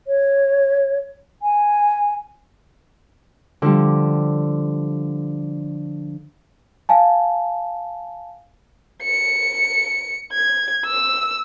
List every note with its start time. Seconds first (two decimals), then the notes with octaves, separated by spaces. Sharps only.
0.07 C#5
1.42 G#5
3.62 D3 F3 G3
6.89 F5 G#5 A5
9.03 C#7
10.33 G#6
10.86 E6